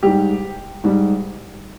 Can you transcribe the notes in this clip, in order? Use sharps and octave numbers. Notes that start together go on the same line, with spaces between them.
G#2 G3 G4
G#2 G3